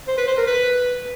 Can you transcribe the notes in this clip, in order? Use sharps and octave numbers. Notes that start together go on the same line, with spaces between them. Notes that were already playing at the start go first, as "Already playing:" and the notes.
C5
B4
C5
A#4
B4